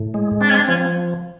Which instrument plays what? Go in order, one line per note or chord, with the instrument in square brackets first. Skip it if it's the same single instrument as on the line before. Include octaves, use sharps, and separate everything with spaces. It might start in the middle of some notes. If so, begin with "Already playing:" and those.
Already playing: [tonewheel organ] A2
G#3
[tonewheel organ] C4 [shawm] D4
[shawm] C#4
D4
[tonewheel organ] F3 [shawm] C#4